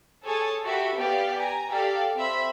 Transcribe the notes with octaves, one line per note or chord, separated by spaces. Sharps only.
G#4 A4 C#5 G#5 A5
F#4 G4 A4 E5 B5
B3 G4 D5 F5
G#5 A#5
G4 A4 D5 F5
C4 C5 E5 B5